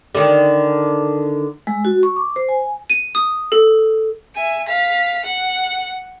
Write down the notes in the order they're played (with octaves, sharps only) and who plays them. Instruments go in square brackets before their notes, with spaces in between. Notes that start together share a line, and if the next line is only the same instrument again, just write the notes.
[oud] D3 D#3
[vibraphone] G#3
F#4
C#6
D6
C5
G#5
[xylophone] D#7
D#6
A4
[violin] E5 G#5
F5 B6
F#5